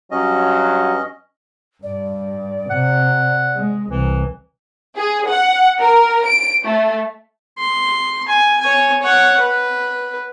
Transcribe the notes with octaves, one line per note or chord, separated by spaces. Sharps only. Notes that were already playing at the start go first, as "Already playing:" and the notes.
G2 F#3 C#4 D#5
G2 D5
C3 F#5
G#3
C2 E3
G#4
F#5
A#4
D7
A3
C6
G#5
C#5 G#5
C#5 F#5
B4